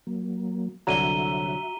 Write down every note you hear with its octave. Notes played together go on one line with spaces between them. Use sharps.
F#3 A#3
C2 D3 F#3 F#4 E5 A#5 D#7 G7